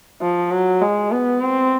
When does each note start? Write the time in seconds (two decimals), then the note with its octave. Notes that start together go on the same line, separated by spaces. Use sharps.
0.21 F3
0.51 F#3
0.81 G#3
1.11 B3
1.42 C4